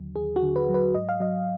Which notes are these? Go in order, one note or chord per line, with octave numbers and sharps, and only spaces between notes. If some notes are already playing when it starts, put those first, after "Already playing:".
Already playing: D#2 D3 F#3
D#2 G#4
F#4
D3
B4
F#3
B4
G#2 D#5
F5
F#3 D#5